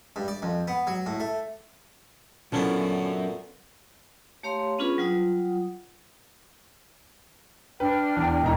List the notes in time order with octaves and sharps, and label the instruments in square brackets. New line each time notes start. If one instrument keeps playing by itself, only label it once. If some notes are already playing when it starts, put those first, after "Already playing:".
[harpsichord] G2
D5
F2
B3
F#3
A2
A3
[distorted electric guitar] F#2 [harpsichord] A#2 A3 B3 [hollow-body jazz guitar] D3 C#4 E4
[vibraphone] A3 G4 C#5 F5 A#5 C6
B3 C#4 D4 F4 G#4 B4
F#3 G3 F4 F#5 D#6
[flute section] D4 G5 F6 [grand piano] B4
[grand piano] E2
E1 D#4 A#5